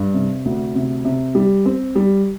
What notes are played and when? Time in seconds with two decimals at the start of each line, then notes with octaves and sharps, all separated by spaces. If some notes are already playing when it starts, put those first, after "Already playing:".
Already playing: G2
0.14 C3
0.45 D2
0.75 C3
1.05 C3
1.35 G3
1.65 C4
1.95 G3